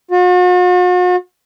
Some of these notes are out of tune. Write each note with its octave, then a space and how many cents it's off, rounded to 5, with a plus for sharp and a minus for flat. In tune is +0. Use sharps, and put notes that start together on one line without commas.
F#4 -45